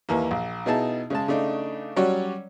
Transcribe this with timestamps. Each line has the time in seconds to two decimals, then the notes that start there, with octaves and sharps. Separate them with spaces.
0.09 D#2 E3 A#3
0.31 A#1
0.66 B2 B3 D#4 E4 G#4 A5
1.10 C#3 G#3 A5
1.28 C#3 A3 D4 D#4
1.96 F#3 G3 C#4 F#4 C#5 D5